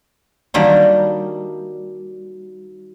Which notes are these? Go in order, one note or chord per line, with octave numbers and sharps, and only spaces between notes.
D#3 F#3 G3 A#3 D4 D#4